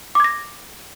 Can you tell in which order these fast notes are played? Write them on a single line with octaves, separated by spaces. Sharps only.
D6 G#6 A#6